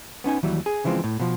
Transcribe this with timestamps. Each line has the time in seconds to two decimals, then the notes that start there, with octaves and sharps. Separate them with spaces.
0.24 B3 C#4 D#4 G#5
0.43 D#2 E3 F#3 G3
0.66 G#4
0.84 C#3 E3 F3 G#3 C4
1.04 A2
1.20 B2 F3